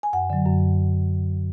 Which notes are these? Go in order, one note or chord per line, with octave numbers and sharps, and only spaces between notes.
G#5
F#2 F#5
D3 F#3
F#2